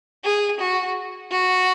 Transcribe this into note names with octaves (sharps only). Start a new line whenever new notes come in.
G#4
F#4
F#4